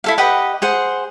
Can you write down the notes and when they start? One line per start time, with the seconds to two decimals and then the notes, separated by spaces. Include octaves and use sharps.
0.04 E4 A4 F5
0.18 G4 B4 D#5 F#5
0.62 G#4 C5 F#5